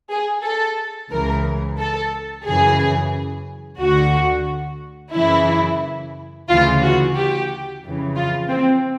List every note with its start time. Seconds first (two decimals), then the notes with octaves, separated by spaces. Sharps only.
0.10 G#4
0.43 A4
1.10 C#2 C#3 E3 A#4
1.78 A4
2.45 F#2 C#3 E3 G#4
3.80 D2 D3 F#4
5.14 F#2 C#3 E3 E4
6.48 D2 C#3 E3 F4
6.82 F#4
7.16 G4
7.83 F2 C#3 E3
8.16 F4
8.51 C4